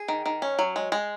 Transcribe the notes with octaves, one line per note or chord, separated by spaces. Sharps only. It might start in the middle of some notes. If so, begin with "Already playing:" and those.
Already playing: G#4
D#3
D#3
C#4
F#3
G#3
G#3